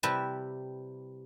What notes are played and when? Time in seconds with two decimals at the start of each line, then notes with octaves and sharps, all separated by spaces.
0.03 C3 G3 E4 B4 A5